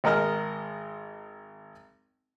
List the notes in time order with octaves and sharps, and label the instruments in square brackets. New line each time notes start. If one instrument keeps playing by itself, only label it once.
[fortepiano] G#1 G#3 A#4 D#5 F6